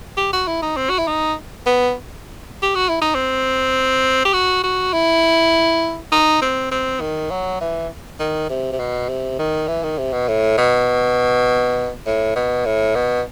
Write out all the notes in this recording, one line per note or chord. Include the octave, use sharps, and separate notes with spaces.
G4
F#4
E4
D#4
C4
F#4
E4
D#4
B3
G4
F#4
E4
D#4
C4
G4
F#4
F#4
E4
D#4
C4
C4
D#3
F#3
E3
D#3
C3
C3
B2
C3
D#3
E3
D#3
C3
B2
A2
B2
A2
B2
A2
B2